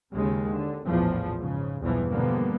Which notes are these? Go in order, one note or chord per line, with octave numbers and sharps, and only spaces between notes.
D#2 C#3 G#3
D3
A#1 E2 A2 F3
G#2 C#3
B1 E2 G2 B2 E3 F3
B2 D3 F3 G3 A#3 B3